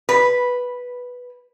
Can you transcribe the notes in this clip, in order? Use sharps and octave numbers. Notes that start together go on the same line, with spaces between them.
B4